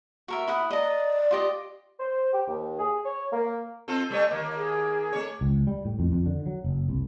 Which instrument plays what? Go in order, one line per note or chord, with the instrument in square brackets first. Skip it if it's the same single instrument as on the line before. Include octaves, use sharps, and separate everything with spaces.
[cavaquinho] F#4 A#4 E5
E4 F#5 D#6
[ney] D5 [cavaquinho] D#5 A#5
[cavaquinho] F4 G4 D#5
[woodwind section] C5
G4
D#2
G#4
C#5
A#3
[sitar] C4 F4 A4
G3 A3 C#5
D#2 A#3
[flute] G#4
[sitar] A3 C#5
[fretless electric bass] C#2
G3
A2
F2
F2
D3
F#3
F#1
C2